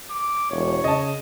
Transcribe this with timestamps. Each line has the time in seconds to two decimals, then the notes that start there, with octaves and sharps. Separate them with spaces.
0.10 D6
0.51 E1 C#5
0.84 C#3 D#5 A5